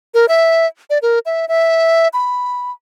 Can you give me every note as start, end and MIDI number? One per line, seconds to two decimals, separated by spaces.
0.14 0.26 70
0.29 0.66 76
0.90 0.98 74
1.02 1.19 70
1.26 1.48 76
1.48 2.08 76
2.13 2.71 83